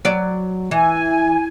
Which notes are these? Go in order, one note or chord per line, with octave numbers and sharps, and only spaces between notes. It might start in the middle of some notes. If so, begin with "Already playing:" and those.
F#3 D5
E3 G#5